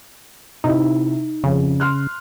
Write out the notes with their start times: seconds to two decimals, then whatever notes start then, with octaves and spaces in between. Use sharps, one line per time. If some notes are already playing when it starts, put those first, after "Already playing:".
0.64 C3 D#4 E4
1.44 F2 C#3
1.80 C6 F6 F#6